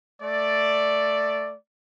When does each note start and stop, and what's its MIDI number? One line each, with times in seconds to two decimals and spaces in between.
0.21 1.55 57
0.21 1.55 74